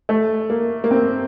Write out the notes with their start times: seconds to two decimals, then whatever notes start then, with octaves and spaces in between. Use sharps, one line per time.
0.09 A3
0.50 A#3
0.84 A#3
0.91 C4